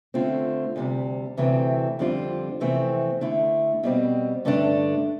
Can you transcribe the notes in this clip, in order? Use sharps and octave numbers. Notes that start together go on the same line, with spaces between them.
D3 A3 C4 F4
D2 C3 G3
D2 C3 E3 A3 C4
F2 D3 G3 C4 F4
F2 C3 E3 A3 C4
D3 A3 E4
B2 G3 C4
G2 D3 A3 D4